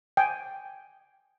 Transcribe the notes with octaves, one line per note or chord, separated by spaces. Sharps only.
G5 G#5